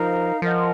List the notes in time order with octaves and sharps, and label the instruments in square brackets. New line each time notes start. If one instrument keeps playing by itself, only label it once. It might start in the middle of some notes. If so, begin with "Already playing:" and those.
Already playing: [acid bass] F3 [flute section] D#4 A#4 F5
[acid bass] F3 [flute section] A#4 D#5 F#5